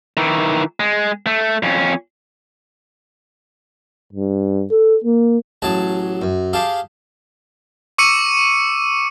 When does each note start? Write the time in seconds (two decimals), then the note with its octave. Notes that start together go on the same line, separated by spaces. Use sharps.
0.17 D#3 E3
0.80 G#3
1.27 A3
1.63 F2 C#4
4.13 G2
4.71 A4
5.04 A#3
5.62 A1 F#3 G#4 A5
6.22 F#2
6.53 G4 G#4 F5 A5
7.98 C#6 D6 E6 C#7 D#7